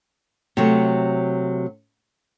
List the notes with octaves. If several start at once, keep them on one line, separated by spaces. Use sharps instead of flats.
C3 F#3 A3